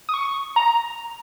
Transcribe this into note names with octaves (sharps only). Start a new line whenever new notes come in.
D#6
C#6
A#5